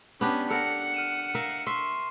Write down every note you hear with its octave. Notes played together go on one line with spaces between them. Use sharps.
B3 C#4 D4 G4
A4 A#4 F#5 C#7
F6 D#7 E7
A#4 E5 F5
E5 C6 C#6 C7